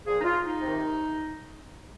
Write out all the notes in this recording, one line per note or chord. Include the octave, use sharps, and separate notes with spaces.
A#2 F3 G#4
D#4
F4
D#4
C3 D#3